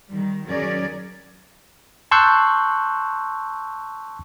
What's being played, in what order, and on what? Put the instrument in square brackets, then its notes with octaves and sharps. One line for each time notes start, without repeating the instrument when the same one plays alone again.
[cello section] D#3 G3
D#3 F#3 C#4 G#4 A#4 D5
[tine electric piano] A5 C6 C#6 E6 F#6 G6